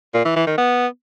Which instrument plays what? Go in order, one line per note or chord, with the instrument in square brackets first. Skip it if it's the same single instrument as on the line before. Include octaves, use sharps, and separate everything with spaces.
[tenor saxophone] A#2
E3
E3
D#3
B3